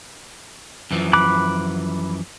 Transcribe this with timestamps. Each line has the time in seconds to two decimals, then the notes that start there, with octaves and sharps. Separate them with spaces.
0.91 F#2 E3 F3
1.13 B5 D6 F#6